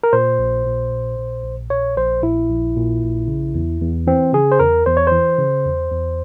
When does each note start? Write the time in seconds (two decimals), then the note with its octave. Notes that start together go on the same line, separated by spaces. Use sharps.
0.03 A#4
0.13 A#2 C5
0.39 A#1
0.66 A#2
0.92 A#1
1.18 A#2
1.44 A#1
1.70 A#2 C#5
1.97 A#1 C5
2.23 A#2 E4
2.50 A#1
2.76 A#2
3.02 A#1
3.28 C#3
3.55 E2
3.81 E2
4.07 E3 C4
4.33 C#3 G#4
4.52 C5
4.59 E2 A#4
4.86 E2 C5
4.97 C#5
5.07 E3 C5
5.38 C#3
5.65 E2
5.91 E2